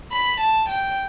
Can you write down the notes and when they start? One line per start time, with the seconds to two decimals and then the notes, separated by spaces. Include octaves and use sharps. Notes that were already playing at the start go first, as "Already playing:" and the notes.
0.12 B5
0.41 A5
0.69 G5